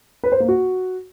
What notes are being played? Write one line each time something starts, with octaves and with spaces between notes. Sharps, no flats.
B4
C5
A#3
F#4